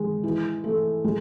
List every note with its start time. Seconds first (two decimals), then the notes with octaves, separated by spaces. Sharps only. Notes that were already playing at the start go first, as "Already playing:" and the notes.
Already playing: D#3 G#3
0.24 E3
0.64 A3
1.04 G#3